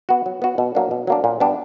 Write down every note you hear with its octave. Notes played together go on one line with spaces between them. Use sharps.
B3 F#4
F#3
B3 F#4
B2
F#3 A#3 D4
B2
F#3 A#3 D4
A#2
G3 B3 D4